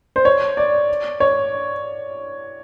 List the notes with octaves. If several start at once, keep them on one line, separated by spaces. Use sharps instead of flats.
C5
C#5
D5
C#5